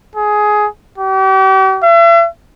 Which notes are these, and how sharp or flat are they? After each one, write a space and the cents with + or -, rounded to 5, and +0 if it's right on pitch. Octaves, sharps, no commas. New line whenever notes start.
G#4 +15
G4 -40
E5 +40